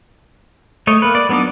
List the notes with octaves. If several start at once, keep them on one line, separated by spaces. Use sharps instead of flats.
A3 C#5 D#5
A#3 B4
D5
F#3 B3 D4 D#4 D6